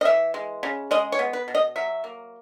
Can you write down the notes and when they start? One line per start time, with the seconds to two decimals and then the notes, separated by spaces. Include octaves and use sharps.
0.01 D#5
0.05 E3 E5
0.34 G#3
0.63 C#3
0.91 G#3 D#5
1.12 C#5
1.19 B3
1.33 B4
1.48 B2
1.55 D#5
1.76 F#3 E5
2.04 A#3